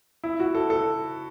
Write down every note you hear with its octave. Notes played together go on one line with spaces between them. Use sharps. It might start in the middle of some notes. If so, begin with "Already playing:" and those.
E4
F#4
A4
A4